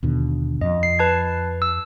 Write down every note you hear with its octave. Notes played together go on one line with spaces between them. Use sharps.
D#2 B2 D3
F2 D#5
C7
B4 A5 G#6
E6